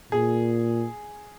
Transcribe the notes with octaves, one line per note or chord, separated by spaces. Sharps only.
A#2 G#4